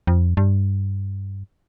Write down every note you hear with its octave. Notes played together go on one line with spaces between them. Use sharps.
F2
G2